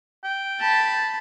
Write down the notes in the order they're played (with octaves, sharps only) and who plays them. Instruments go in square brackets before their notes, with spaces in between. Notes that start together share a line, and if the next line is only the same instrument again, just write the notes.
[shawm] G5
[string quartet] A5 B5 A6